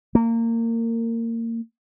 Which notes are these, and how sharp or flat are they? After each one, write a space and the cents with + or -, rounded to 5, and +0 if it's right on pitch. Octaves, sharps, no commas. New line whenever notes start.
A#3 -25